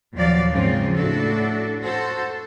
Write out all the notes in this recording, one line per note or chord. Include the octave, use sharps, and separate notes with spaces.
D#2 A#2 F3 F#3 D5 F5
G#2 C#3 F3 C4 F4
A2 D4 F#4 A4
F#4 A4 C5